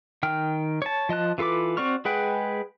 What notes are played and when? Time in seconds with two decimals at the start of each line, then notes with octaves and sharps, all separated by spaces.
0.23 D#3 G5 F6
0.82 C#5 A5
1.09 F3 D#5 A5 F#6
1.38 E3 F4 A4 B4 D6
1.77 C4 F#4 D5 C#6 F6
2.05 G#3 G#4 B4 F#5 G5